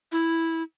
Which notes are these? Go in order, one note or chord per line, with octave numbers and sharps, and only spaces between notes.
E4